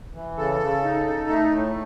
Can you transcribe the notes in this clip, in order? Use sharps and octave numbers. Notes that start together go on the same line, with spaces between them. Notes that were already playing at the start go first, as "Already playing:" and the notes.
E3
C#3 A4
C#3
D#4
D#4
A3
A2